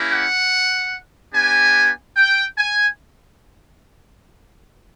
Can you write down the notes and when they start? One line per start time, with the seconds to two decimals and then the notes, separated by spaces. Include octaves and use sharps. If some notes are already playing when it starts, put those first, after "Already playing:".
Already playing: A#3 C#4 E4 G4
0.09 F#5
1.33 B3 D4 G4 G#5
2.17 G5
2.58 G#5